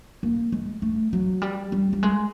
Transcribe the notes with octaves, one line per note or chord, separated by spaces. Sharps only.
A#3
G#3
A3
F#3
G3
G3
G3
G#3